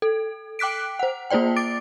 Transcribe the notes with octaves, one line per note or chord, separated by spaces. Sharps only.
A4
G5 D6 F#6 B6 D7
C5 F#5
A#3 F4 C5 D5 G5
D6 A6 D7